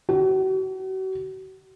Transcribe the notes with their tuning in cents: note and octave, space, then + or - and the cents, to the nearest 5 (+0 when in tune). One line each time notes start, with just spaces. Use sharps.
F#4 +40